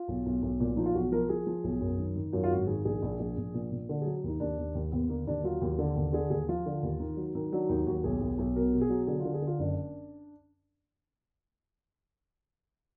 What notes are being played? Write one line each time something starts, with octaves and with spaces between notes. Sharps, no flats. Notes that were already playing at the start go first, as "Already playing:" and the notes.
Already playing: F4
B1
B1
B1
A#2
F3 D#4
F4
B1 F#4
F3 A#4
F3 G#4
F3
B1
F#2
D#3
D#3
F#2 F4
F4
G#1 F#4
D#3 G#4
A#1 G#4
A#1
A#1
A#1
A#2
A#2
D3
F#3 G#4
D#2 D#4
D#2 D4
D#2
D#2
D#2 B3
D3 A#3
D#2 D4
F#3 F4
D#2
D3
D#2
D3 G#4
D#2 G#4
F3 F4
D3
D#2
D#3
F#3
D#3
F#3 D4
D#2 D#4
D#2 F#4
B1 G#4
B1
B1
B2 A#4
B2
G#4
F#3
D3 G#4
F4
D3
G#4
D3 F4
F#1 D4